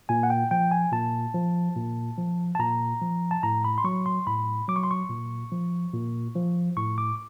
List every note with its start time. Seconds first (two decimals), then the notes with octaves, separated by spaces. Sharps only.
0.09 A#2 G#5
0.23 F#5
0.30 G5
0.51 F3 G5
0.71 G#5
0.92 A#2 A5
1.34 F3
1.76 A#2
2.18 F3
2.55 A5
2.59 A#2 A#5
3.02 F3
3.31 A5
3.43 A2 A#5
3.65 B5
3.78 C6
3.84 F#3 C#6
4.06 C6
4.27 A2 B5
4.68 F#3 D6
4.76 C#6
4.83 C6
4.91 C#6
5.10 A#2
5.52 F3
5.93 A#2
6.35 F3
6.77 A2 C#6
6.98 D6